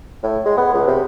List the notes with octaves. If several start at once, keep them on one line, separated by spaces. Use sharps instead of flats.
A2
G#3
B3
C#2
C3